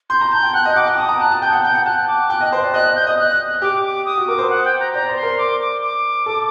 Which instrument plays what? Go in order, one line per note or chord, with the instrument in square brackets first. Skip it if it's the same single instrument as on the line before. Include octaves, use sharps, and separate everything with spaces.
[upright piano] C6 [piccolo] G6
[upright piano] A#5
[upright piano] A5 [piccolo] G6
[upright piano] G5
[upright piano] F#5 [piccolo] F#6
[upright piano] D#5
[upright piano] F#5 [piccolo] D6
[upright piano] G5
[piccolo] D6
[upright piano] A5 [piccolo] D#6
[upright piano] A#5
[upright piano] A5 [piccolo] F#6
[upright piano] A5
[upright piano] G5 [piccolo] G6
[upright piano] F#5
[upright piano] G5 [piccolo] G6
[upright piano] F#5
[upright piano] A5 [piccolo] F#6
[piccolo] D6
[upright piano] G5 [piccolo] F#6
[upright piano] D#5
C5
D5
[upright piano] D#5 [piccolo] F#6
[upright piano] D#5
[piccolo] G6
[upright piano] D#5 [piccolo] D#6
[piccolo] F#6
[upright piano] G4 [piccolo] D6
[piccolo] D6
D#6
[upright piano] F#4
[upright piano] A#4 [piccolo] D6
[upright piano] C5
[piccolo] F#5
G5
A#5
[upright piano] D5 [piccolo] A#5
[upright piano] C5
[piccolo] C6
[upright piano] A#4
[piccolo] D6
D6
D6
[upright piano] A4